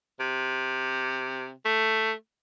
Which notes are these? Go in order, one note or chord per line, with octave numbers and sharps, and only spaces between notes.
C3
A3